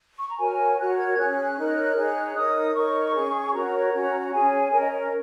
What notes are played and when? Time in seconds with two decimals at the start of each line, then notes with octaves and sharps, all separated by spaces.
0.19 C#6
0.29 A#5
0.38 F#4 A#4 C#5 G#5
0.78 F#4 A#4 C#5 F#6
0.97 G#6
1.17 C#4 G#4 C#5 F#6
1.57 D#4 A#4 C#5
1.96 D#4 G#4 C#5
2.35 D#4 A#4 C#5 D#6
2.74 D#4 A#4 C#5 C#6
3.14 C#4 G#4 C#5
3.52 F#4 A#4 C#5 A#5
3.93 C#4 F#4 C#5
4.32 C#4 G#4 C#5 G#5
4.71 C#4 A#4 C#5 G#5
4.81 D#5
4.91 C#5